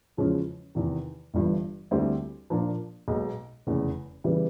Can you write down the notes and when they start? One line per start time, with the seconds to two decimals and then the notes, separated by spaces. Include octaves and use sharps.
0.17 E2 C#3 F3 G#3 C#4
0.75 E2 C3 D#3
1.34 G1 G2 E3
1.91 D2 D3 G3 C4 E4
2.50 A#2 F3 A#3 D4 F4
3.08 B1 B2 G#3
3.67 F1 E2 C#3
4.24 C#3 E3 G3 B3